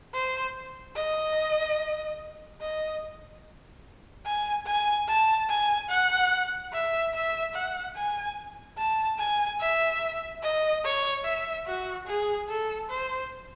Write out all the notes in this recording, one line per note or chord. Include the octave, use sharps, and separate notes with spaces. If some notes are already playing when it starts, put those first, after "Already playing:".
C5
D#5
D#5
G#5
G#5
A5
G#5
F#5
E5
E5
F#5
G#5
A5
G#5
E5
D#5
C#5
E5
F#4
G#4
A4
C5